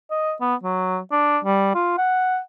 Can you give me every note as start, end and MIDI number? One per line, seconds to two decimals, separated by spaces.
0.11 0.34 75
0.41 0.55 59
0.63 0.98 54
1.12 1.38 62
1.45 1.72 55
1.75 1.98 65
1.98 2.39 78